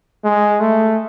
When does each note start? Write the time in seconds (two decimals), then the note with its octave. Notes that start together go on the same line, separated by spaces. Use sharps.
0.25 G#3
0.60 A3